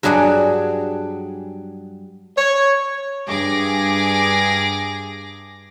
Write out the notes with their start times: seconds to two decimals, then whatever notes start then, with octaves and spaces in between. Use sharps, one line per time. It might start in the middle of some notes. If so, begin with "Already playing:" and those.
0.03 G2 F#3 D4 G#4 F#5
2.38 C#5
3.26 G2 G#4 D6 A#6